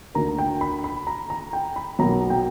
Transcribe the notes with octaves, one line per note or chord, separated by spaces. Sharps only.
D2 D3 A#3 A#5
G5
B5
B5
A#5
A#5
G5
B5
B1 B2 A#3 A#5
G5